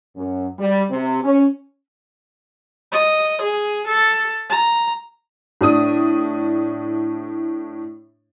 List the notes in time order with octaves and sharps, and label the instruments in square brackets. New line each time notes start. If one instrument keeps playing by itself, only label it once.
[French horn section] F#2
G3
C3
C#4
[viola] D#5
G#4
A4
A#5
[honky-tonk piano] A2 D4 D#6